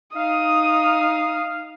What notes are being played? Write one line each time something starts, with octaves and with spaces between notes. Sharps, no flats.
D#4 F5 D#6